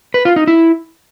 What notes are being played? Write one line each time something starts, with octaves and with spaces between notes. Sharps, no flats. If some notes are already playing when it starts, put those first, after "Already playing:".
B4
F4
D#4
E4